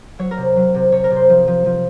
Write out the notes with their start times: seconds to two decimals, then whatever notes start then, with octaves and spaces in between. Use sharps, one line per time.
0.19 F#3 C#5
0.31 A#4
0.37 C3
0.56 F#3
0.75 C3
0.92 C3 C#5
1.04 A#4
1.10 C3
1.16 C5
1.29 F3
1.48 F3
1.66 F3